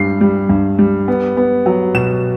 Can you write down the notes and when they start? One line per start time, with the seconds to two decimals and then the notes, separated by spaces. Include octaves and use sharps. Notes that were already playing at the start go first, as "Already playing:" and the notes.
Already playing: G2 G3 C7
0.21 G3
0.49 G2
0.79 G3
1.08 B3
1.37 B3
1.66 F#3
1.94 B2 E7